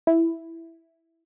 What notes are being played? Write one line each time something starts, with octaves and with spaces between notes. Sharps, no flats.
E4